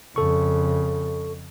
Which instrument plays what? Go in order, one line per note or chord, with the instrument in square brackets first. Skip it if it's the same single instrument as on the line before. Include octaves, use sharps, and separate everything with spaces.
[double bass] F2 C#3 [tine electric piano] A4 C#6